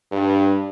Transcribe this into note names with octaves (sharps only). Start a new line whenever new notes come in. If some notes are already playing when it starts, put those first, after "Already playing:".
G2